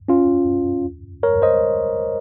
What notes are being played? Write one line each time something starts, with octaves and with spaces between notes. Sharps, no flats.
C#4 F4
A#4 C#5
C5 D#5